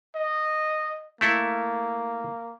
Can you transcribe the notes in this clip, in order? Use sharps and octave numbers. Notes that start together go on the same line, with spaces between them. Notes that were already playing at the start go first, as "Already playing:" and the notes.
D#5
A3 A#3 E4 A4